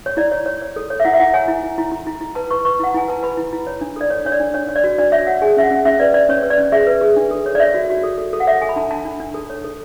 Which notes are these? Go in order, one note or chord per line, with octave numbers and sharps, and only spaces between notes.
C#5
E4 D5
C#5
C#5
C#5
A4
C#5
E5
E4 F#5
E5
E4 F#5
C#5 G#5
E4
E4
E4
E4
E4
E4
B4 A5
B4 C#6
B4 C#6
E4 F#5
E4 G#5
B4 A5
B4 B5
E4
E4
C#5
D4
A4 D5
C#5
D4 C#5
D5
D4
D4 C#5
C#5
D5
F#4
D4 D5
C#5 E5
C#5 F#5
G#4 G#5
C#4 E5
F#5
C#4
C#4 E5
B4 D5
C#4 D5
C#4 C#5
B4
D5
C#4
G#4 E5
B4
G#4
D4
A4
C#5
D5
C#5 E5
F#4
F#4
A4
A4
A4
F#5
C#5 E5
A4 G#5
B5
D4 A5
D4 A5
D4
D4
A4
C#5
A4